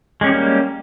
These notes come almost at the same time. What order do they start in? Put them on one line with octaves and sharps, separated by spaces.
G#3 C#4 G4 G3 A#3